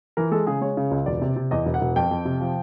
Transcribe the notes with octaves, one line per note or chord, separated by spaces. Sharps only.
E3 A#4
G#3 A4
C#3 G#4
G#3 C#5
C#3
C#2
E1 D5
C3
C3
E2 D#5
E1
F#5
E1
F2 G5
F2
C3
F3